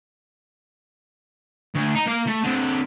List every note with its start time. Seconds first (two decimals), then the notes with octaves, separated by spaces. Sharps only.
1.75 D2
1.95 D#4
2.07 A#3 F5
2.27 A3
2.44 D3 C4